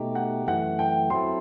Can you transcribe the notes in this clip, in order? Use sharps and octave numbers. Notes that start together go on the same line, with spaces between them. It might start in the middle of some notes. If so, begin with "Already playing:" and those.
Already playing: B2 A3 D#4 G4
F#5
F#2 E3 A3 F#5
G5
F#3 C4 E4 A4 C6